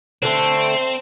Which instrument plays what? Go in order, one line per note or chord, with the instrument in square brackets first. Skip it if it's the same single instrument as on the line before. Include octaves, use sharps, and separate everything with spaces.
[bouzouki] D3 A3 [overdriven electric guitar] C4